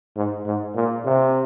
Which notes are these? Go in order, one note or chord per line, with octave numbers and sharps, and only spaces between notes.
G#2
G#2
A#2
C3